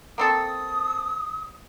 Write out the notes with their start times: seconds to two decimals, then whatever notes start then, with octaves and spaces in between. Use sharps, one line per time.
0.18 A#3 C4 A4 D#6